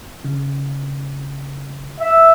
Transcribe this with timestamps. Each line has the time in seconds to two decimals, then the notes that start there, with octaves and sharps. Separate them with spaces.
0.24 C#3
2.00 E5